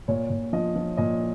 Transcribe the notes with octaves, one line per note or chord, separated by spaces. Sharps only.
A#2 C#5
A#2
F3 D#5
F3
A#2 D#5